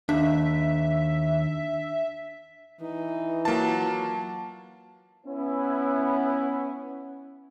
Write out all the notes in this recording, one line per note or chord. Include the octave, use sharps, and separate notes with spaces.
D#2 D4 E5
E3 D#4
F#3 A#3 F4 A5
B3 C#4 E4